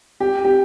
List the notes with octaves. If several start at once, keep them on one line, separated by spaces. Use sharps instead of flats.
G4
G4